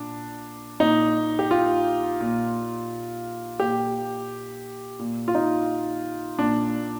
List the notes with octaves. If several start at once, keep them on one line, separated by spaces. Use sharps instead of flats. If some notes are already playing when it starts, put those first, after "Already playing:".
Already playing: A#2 D4
A#2 D#4
G4
F4
A#2
A#2 G4
A#2
F4
D#4
A#2 D4